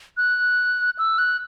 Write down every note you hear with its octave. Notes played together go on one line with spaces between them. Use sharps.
F#6
E6
F#6